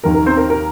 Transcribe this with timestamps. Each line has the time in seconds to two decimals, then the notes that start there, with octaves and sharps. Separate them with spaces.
0.03 D#2 D#3 A#3 A#4
0.14 A#4
0.26 C4 C5
0.37 A#4
0.50 A#4